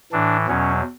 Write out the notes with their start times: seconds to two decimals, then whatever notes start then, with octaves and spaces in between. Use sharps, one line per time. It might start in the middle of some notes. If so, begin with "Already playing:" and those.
0.12 A2 E3 D4
0.48 E2 B2 F#3 C#4